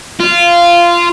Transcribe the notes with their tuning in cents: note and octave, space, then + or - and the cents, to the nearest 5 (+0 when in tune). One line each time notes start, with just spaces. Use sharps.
F4 -15